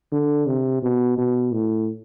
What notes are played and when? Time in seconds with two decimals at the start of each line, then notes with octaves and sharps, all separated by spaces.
0.12 D3
0.46 C3
0.82 B2
1.18 B2
1.52 A2